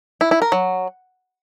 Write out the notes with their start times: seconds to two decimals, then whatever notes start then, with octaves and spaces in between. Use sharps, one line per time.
0.21 E4
0.31 E4
0.42 A#4
0.52 F#3